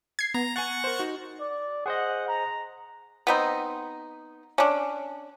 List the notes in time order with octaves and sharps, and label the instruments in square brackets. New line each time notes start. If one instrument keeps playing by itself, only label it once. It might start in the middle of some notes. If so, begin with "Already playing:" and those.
[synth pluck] G#6 C7
[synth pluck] B3 [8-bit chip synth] A#5
[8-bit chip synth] F#5 C#6 [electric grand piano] G#5 A6
[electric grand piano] A#4 C5
D#4 F#4
[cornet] D5
[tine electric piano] G#4 C5 D#5 [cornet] F#5
[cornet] A#5
[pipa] B3 C4 D#4
C#4 D4